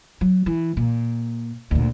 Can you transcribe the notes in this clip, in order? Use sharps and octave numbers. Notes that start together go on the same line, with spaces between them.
F#3
E3
A#2
D2 A#2